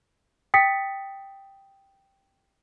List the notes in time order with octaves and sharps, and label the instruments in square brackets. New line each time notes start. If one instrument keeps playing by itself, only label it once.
[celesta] G5 D#6 A6 B6 C#7